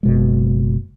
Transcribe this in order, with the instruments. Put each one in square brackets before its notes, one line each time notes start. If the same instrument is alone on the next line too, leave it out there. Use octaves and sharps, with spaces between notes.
[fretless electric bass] F#1 B2 G#3